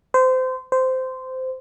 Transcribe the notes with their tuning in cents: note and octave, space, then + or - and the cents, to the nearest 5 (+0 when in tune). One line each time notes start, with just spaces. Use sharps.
C5 -25
C5 -15